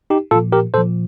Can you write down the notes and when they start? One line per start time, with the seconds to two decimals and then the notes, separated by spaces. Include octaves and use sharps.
0.10 D#4 G4
0.31 A#2 F3 F4 A4
0.52 G4 A#4
0.74 A#2 F3 A4 C5